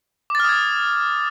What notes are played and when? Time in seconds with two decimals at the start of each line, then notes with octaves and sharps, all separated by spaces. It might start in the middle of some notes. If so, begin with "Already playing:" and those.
0.30 D6
0.35 A6
0.40 F6
0.44 D#6
0.49 G#6